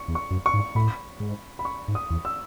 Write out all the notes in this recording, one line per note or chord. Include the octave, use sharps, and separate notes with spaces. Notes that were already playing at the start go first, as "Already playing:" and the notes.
Already playing: C#6
E2
C#6
F#2
C#6
G#2
A2 B5
G#2
B5
C#6
G#2
D#6
E2
E6